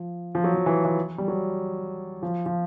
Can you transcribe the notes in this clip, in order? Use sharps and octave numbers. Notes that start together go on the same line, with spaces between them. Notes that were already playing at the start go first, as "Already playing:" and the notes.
Already playing: F3
F3
F#3
F3
E3
E3
G3
F#3
F3
F3